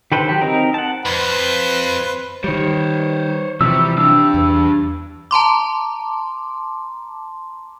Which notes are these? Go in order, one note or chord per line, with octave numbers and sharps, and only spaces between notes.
D#3 G4 A4 B4 C5
F#3 G4
C4 D#4 A#4
F#5 A5
F2 B4 C5
D#3 G3 C5 C#5
C3 E3 F3 G3 F#4 E5 E6
D4 G4 E6
E2
A5 A#5 C6 D6